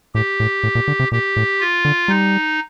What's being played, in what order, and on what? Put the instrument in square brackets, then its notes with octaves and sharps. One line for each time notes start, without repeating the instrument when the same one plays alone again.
[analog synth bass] A2 [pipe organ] G4
[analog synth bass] A2
A2
A#2
D3
C3
[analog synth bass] A#2 [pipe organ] G4
[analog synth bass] A2
[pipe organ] F4
[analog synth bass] D3
[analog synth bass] G3 [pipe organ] D#4